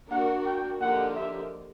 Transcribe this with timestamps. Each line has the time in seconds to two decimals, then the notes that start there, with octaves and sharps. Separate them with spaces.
0.11 A#3 D4 F#4 A#4 F#5
0.45 G5
0.81 D3 F3 A#3 D#4 G4 F#5
1.16 E5